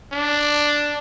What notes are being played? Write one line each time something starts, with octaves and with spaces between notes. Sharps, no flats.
D4